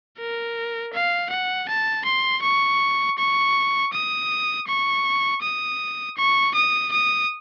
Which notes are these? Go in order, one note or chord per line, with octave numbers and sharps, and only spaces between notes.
A#4
F5
F#5
A5
C6
C#6
C#6
D#6
C#6
D#6
C#6
D#6
D#6